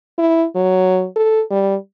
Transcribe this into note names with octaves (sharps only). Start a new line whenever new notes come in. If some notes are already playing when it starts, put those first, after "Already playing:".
E4
F#3
A4
G3